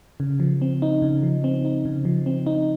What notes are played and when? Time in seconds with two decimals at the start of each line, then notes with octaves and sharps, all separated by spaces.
0.20 C#3
0.40 F3
0.62 C4
0.82 D#4
1.02 C#3
1.23 F3
1.44 C4
1.65 D#4
1.85 C#3
2.05 F3
2.26 C4
2.46 D#4